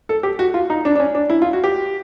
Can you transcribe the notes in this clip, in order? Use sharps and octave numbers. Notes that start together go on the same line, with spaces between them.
A4
G4
F#4
F4
D#4
D4
D4
C#4
D4
E4
F4
F#4
G4